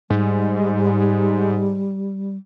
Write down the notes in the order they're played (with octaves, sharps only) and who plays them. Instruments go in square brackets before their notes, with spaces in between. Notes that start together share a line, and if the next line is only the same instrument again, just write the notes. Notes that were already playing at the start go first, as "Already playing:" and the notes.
[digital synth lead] G#2 [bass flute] G3